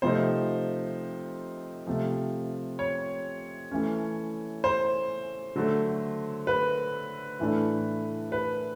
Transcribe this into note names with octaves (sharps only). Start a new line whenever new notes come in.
C3 F3 A3 C4 D#4 C5
C3 F3 A3
C#5
E3 A3 C#4
C5
D3 F#3 A3
B4
A2 E3 A3 D4
B4